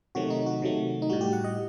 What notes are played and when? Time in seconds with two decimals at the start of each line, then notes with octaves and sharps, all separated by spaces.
0.15 C3 D#3 F#3 A3 F#4
0.30 D#4
0.46 F#4
0.62 C3 D#3 F#3 A3
1.02 D#4
1.09 A2 G3 F#4
1.21 G4
1.33 F#5
1.44 D#5